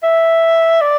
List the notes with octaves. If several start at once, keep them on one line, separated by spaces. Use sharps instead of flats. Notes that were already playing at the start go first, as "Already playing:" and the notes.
E5
D5